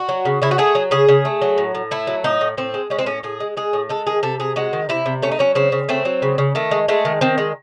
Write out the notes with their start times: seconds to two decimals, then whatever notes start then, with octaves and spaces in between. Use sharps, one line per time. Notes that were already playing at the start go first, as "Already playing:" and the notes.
Already playing: F#4
0.09 F#3
0.25 C#3
0.42 C#3 E4
0.51 F#4
0.58 A3 G#4
0.75 F#3
0.91 C#3 G#4
1.08 C#3
1.25 A3
1.42 F#3
1.58 A2
1.75 A2
1.91 A3 E4
2.07 F#3
2.24 A2 D#4
2.41 A2
2.57 A2 C4
2.74 G#3
2.90 G#3 C#4
2.99 C4
3.06 A2 C#4
3.23 A2 G#4
3.40 G#3
3.57 G#3 G#4
3.73 A2
3.89 G#3 A4
4.07 D#3 G#4
4.23 C3 A4
4.40 C3 G#4
4.56 G#3 F#4
4.73 D#3
4.89 C3 E4
5.06 C3
5.22 A3 C#4
5.32 D#4
5.39 F#3 C#4
5.55 C#3 C4
5.72 C#3
5.89 A3 C4
6.05 F#3
6.22 C#3
6.38 C#3
6.55 D#3 A3
6.71 G#3
6.88 G#3 A3
7.05 D#3
7.21 D#3 C4
7.38 G#3